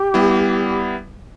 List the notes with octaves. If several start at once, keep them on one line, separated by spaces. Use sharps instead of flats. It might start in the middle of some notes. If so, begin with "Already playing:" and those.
Already playing: G4
G3 B3 E4